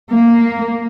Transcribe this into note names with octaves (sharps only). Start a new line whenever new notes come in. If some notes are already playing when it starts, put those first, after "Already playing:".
A#3